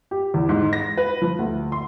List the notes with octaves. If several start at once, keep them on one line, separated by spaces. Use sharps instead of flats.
G4
E2
G#2
A#6
B4
F3
D2
C6